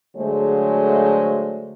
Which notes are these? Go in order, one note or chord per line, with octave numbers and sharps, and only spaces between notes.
D3 F#3 G#3 A3 G#4 C5